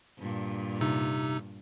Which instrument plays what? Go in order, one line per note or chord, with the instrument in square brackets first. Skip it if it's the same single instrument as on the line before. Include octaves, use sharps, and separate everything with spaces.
[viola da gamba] G2 A#2
[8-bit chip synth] C3 D#4 E6